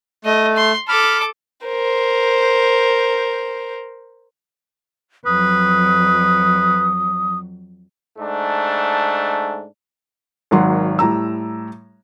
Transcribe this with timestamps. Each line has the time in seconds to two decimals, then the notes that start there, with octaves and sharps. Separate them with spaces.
0.25 A3 D#5
0.56 C6
0.89 A4 B5 D6 F6
1.66 A#4 C5
5.26 F2 F#3 B4 D#6
8.19 G#2 A3 D4
10.51 G#1 D#3 F#3 F#5 C6
10.99 A2 G3 A#5 E6